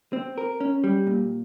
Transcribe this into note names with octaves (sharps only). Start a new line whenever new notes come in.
C4
A#4
C#4
G3
A#2